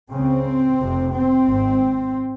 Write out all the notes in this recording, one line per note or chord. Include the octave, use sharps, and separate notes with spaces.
C#2 C#3 C4
F1 F2 C3
C4
G#1 G#2